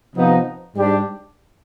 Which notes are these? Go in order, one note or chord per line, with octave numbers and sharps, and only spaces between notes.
C3 F3 B3 D#4
G#2 G3 D4 G4 D5